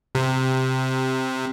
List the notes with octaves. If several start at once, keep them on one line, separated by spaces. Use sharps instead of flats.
C3